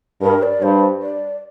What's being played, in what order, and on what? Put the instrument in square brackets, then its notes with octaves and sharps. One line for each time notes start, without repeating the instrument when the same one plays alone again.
[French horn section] G2 [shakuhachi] A#4
[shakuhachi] D5
[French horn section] G2 [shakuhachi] C5
[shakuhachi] D5